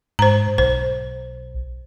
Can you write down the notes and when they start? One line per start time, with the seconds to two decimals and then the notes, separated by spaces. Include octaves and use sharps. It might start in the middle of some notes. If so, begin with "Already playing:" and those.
0.19 G#2 C5 A#5
0.58 B1 C5